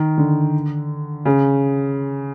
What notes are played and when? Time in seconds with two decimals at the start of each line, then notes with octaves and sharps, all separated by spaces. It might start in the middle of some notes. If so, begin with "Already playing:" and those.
Already playing: D#3
0.18 D3
1.25 C#3